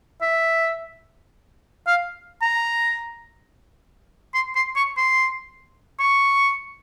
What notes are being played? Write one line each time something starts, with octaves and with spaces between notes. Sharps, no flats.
E5
F5
A#5
C6
C6
C#6
C6
C#6